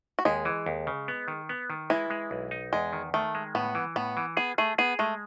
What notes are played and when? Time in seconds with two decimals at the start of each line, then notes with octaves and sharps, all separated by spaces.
0.19 F#4
0.25 D#2 G#3 G#4
0.45 E3
0.66 D#2
0.87 C#3
1.08 B3
1.28 D#3
1.49 B3
1.70 D#3
1.90 E3 G#3 E4
2.10 G#3
2.31 B1
2.51 D#4
2.73 E2 G#3
2.93 D#3
3.14 D#3 A3
3.35 G#3
3.55 A2 B3
3.75 E3
3.96 A2 B3
4.17 E3
4.37 B3 G#4
4.58 A3 G#4
4.78 B3 G#4
4.99 G#3 A3